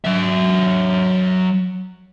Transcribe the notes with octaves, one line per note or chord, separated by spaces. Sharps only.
F#3 E5